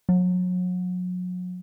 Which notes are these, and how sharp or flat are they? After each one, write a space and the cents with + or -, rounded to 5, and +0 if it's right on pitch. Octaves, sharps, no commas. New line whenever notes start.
F#3 -35